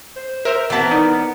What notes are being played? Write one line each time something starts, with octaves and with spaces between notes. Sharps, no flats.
C5
A#4 C5 E5
E3 B3 C4 A#4 A5 B6
D#4 D5
B3